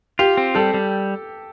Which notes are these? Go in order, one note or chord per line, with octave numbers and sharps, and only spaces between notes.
F4 G4
C4
G3 A4
G3